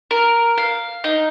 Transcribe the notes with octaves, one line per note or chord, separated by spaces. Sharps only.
A#4
F5
D#4